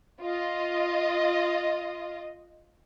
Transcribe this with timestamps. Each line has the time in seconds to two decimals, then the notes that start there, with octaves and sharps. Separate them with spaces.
0.21 F4 D#5